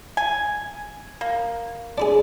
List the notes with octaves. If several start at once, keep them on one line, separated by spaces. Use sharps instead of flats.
G#5
A#3
D4 E4 G#4